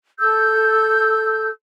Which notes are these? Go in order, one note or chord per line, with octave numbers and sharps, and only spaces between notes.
A4 E6 G6